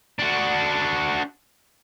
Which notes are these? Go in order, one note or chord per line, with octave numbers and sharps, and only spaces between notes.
D4 F#4